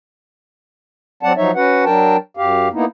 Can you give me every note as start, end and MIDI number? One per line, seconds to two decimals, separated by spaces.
1.23 1.33 54
1.23 1.33 60
1.23 1.33 74
1.23 1.33 78
1.23 1.33 81
1.37 1.51 53
1.37 1.51 54
1.37 1.51 63
1.37 1.51 73
1.37 1.51 76
1.55 1.85 61
1.55 1.85 66
1.55 1.85 71
1.55 1.85 78
1.85 2.17 54
1.85 2.17 62
1.85 2.17 70
1.85 2.17 79
1.85 2.17 81
2.37 2.68 42
2.37 2.68 67
2.37 2.68 77
2.73 2.85 58
2.73 2.85 59
2.73 2.85 63
2.73 2.85 64